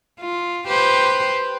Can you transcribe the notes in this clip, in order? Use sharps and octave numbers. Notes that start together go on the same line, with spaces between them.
F4
G4 B4 C5